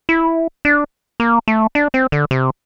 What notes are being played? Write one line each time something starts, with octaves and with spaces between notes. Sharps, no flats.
E4
D4
A#3
A3
D4
C4
D3
C3